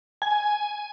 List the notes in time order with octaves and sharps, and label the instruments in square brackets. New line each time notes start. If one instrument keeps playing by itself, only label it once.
[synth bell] G#5